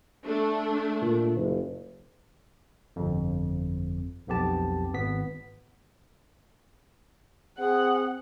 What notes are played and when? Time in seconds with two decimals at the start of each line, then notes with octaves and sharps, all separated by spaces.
0.24 A3 D4
1.01 A#2
1.36 F#1
2.96 G1 F2
4.27 B1 F2 B3 G4 A5
4.93 G#1 B3 B6
7.58 C4 G#4 F#5